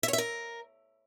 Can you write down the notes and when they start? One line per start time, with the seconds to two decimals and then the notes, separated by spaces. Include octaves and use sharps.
0.03 E5
0.08 C#5
0.13 E5
0.18 A#4